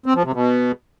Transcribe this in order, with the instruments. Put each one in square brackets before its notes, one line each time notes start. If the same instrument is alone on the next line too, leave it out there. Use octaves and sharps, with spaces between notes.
[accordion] C4
F3
C3
B2